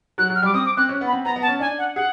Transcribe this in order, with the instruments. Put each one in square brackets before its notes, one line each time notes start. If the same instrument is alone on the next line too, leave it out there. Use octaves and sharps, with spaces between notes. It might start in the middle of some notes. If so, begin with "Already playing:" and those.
[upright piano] F#3 [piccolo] F#6
[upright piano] F#3
[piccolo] F6
[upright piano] G3 [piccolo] D6
[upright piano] C4 [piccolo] D#6
[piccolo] D6
[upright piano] C4 [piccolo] F#6
[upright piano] C#4
B3
[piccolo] B5
[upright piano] C4
[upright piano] B3 [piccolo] A#5
[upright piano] B3
[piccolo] A5
[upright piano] C#4
[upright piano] D4 [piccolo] G#5
[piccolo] F#5
[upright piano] G#4 [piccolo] F#5